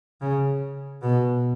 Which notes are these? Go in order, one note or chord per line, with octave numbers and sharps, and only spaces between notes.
C#3
B2